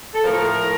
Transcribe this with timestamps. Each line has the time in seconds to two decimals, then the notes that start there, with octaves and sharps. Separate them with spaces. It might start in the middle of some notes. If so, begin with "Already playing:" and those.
0.13 A4
0.23 A2 F3 A#4
0.59 A2 F3